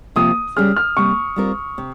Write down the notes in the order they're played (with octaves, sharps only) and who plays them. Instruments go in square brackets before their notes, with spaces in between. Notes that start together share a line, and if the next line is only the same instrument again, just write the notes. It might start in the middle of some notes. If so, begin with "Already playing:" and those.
[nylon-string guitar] C3 F3 A#3 F4 [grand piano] D#6
[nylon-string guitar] C#3 G3 C#4 G#4 [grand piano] F6
[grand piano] F6
[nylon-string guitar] C3 G3 A#3 [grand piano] C#6
[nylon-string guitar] G3 C4 F4 A#4
C3